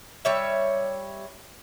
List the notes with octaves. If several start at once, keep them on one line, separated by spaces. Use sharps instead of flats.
G3 C#5 E5